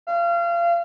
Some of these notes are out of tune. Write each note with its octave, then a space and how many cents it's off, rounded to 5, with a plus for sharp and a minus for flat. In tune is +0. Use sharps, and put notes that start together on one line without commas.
F5 -30